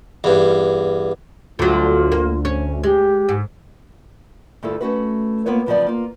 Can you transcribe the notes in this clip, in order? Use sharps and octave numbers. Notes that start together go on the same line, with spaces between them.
E2 G2
D2 D3 F#3 F4
A#3
C#4
G#3 G4
G#2
D2 G2 E4 F4 A4
A3 C#4 F#4 B4
A#3 B3 F4 B4 C#5
G2 C#3 F3 F#3 B3 D5
A#3 F4